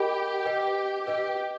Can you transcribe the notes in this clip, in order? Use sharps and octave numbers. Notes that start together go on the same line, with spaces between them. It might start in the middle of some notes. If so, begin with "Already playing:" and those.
Already playing: G4 A#4 D#5 F#5 B5
B4 D#5 G5
G4 B4 D#5 G5